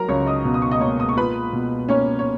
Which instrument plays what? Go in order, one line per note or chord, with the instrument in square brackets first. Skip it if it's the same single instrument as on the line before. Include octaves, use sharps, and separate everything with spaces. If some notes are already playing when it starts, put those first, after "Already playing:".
Already playing: [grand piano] F#3 [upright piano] A#4 A#5
[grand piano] C#2 [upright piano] C#5 C#6
[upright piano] D#5 D#6
[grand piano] B2
[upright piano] D#6
C#6
D#5 D#6
[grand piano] A#3 [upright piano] C#5 C#6
[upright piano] D#6
C#6
[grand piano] F4 [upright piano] B4 B5
[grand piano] B2
[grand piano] A#3 [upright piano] C#4 C#5
[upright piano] C#5